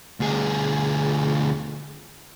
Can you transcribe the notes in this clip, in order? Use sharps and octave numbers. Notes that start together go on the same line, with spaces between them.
D2 G#4